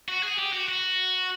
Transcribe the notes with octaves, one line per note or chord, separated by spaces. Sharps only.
F#4
G#4
G4
F#4
F#4